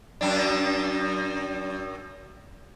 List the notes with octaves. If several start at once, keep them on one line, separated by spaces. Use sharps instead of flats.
F#2 D4